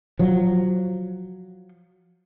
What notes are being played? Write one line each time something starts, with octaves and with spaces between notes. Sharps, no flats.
F3 F#3